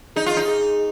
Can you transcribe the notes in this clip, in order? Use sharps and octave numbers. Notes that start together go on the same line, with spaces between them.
D#4 G#4
F4
D#4
G#4